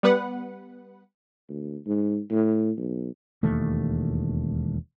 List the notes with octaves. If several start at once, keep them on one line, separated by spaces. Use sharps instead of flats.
G3 B3 B4 F#5
D2
G#2
A2
B1
E1 D#2 A3